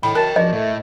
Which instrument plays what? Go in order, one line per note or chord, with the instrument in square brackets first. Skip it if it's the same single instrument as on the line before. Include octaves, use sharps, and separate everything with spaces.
[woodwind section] A2 [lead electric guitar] D#5 G5 [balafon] B5
[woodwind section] F#2 A5 [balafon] A#4
[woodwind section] C#2 D4 F#4 [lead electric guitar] F3 [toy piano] D#5
[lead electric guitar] A2 [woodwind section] A3